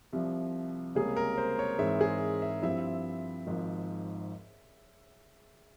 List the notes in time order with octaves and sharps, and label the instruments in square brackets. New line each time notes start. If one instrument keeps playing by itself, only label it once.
[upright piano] C2 C3 F3
[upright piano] C#2 C3 G3 A#3 C#4 [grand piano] G#4
[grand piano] A#4
C5
C#5
[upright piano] G#2 E3 G#3 C4 [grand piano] E5
[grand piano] G#4
E5
[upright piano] G2 F3 C4 E4 [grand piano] E5
[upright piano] G#1 G#2 F3